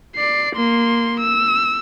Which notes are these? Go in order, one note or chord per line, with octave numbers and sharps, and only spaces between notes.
D5 C7
A#3 C6
E6